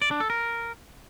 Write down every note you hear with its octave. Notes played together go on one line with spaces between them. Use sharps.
D5
D4
A4
A#4